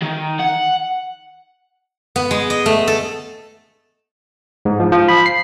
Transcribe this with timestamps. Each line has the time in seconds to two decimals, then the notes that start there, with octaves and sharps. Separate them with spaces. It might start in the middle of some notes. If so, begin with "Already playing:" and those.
0.02 D#3
0.39 F#5
2.16 B3
2.31 G#3
2.50 D#5
2.66 A3
2.87 A4
4.65 G#2
4.80 F3
4.92 F3
5.08 B5
5.26 C7